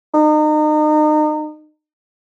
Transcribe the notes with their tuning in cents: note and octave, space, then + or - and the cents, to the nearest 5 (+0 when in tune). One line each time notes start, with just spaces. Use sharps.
D#4 -35